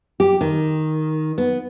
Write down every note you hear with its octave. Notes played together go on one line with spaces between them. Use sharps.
G4
D#3
B3